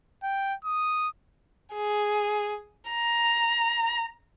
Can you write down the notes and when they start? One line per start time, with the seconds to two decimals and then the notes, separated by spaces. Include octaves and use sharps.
0.23 G5
0.65 D#6
1.74 G#4
2.91 A#5